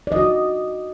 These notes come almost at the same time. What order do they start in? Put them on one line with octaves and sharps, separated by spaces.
D5 D#5 F#4